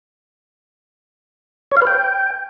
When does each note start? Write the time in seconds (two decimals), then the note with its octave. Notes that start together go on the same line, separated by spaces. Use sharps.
1.72 C#5
1.77 F5
1.82 B4
1.87 G5